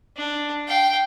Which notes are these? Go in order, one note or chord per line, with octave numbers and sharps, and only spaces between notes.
D4
F5 G5